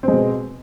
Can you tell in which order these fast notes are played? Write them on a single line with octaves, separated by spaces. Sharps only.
C4 G#3 B2